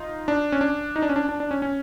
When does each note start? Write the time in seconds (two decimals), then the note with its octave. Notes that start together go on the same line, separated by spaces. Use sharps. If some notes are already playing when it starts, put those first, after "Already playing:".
Already playing: D#4 F4
0.28 D4
0.52 C#4
0.61 D4
0.96 D#4
1.02 D4
1.09 C#4
1.16 D4
1.29 D4
1.40 D4
1.51 C#4
1.62 C#4